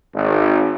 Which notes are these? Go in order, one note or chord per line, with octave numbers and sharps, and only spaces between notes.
G#1